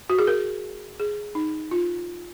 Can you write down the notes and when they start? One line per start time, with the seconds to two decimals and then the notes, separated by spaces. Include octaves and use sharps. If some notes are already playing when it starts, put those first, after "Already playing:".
0.10 F#4
0.19 G#4
0.27 A#4
1.00 G#4
1.35 D#4
1.71 F4